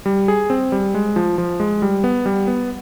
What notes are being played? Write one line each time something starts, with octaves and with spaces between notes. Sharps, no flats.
G3
G#4
C4
G3
G#3
F3
F3
G#3
G3
B3
G3
B3